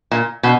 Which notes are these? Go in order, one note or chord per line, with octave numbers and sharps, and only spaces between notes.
A#2
B2